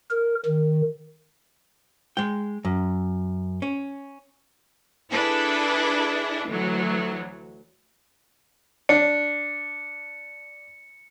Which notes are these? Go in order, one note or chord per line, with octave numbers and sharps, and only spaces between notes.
A#4
D#3
G#3 G5
F#2
C#4
D4 E4 G#4 A4 B4
D2 E3 F#3
D4 C#7